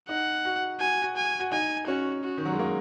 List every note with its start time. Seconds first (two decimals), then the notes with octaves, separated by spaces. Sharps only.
0.09 D#4 F#5
0.45 F#4
0.80 F#4 G#5
1.02 F#4
1.16 G#5
1.40 F#4
1.52 D#4 G#5
1.87 C#4 F#4
2.24 F#4
2.37 D#3
2.45 F#3
2.52 G#3
2.59 A#3